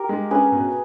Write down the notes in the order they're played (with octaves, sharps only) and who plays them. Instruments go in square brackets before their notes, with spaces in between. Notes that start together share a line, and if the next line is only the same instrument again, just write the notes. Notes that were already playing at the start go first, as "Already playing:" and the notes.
Already playing: [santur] G4 A#4
[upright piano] G#3
[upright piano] C#4 [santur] G#4 B4
[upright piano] B2